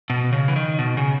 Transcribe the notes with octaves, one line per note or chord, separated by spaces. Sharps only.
B2
C#3
E3
D#3
B2
C#3